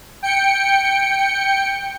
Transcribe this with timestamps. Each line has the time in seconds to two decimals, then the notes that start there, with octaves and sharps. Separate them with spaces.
0.23 G5 C#7